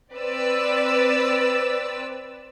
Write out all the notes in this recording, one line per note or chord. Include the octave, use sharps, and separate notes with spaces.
C4 B4 D5 E6